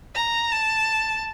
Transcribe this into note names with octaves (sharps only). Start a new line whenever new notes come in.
A#5
A5